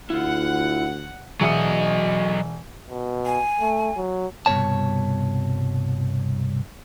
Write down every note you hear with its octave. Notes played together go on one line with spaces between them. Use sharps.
D2 E4 F4 F#5
E1 F#3 D#5 E5 C#7
B2
G#5
A3
F#3
C2 G2 B2 C#5 A5